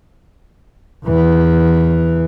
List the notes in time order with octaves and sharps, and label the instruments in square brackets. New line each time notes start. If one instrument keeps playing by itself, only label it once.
[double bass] E2 E3